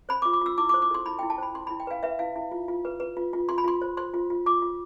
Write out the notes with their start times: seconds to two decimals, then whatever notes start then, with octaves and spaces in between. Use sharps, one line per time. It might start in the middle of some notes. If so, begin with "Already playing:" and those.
0.09 C5 B5
0.22 D6
0.25 F4
0.33 D6
0.41 F4 E6
0.58 E4 D6
0.69 D6
0.74 C5
0.82 D6
0.91 A4 C6
1.06 E4 B5
1.19 G5
1.23 E4
1.30 A5
1.38 C5 B5
1.54 E4 C6
1.67 B5
1.71 E4
1.80 G5
1.87 B4 F5
2.03 B4 E5
2.19 E4 F5
2.36 E4
2.51 F4
2.68 F4
2.85 B4
3.00 B4
3.17 F4
3.33 F4
3.49 F4 C6
3.58 B5
3.64 F4 C6
3.81 C5
3.97 C5 C6
4.14 F4
4.30 F4
4.46 F4 D6
4.62 F4